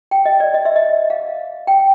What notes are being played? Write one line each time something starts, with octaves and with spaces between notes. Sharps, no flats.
G5
D#5
D5
D#5
E5
D#5
F5
G5